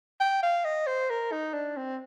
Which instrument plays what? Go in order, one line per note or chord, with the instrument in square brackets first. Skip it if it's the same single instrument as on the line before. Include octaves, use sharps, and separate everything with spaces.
[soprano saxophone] G5
F5
D#5
C5
A#4
D#4
D4
C4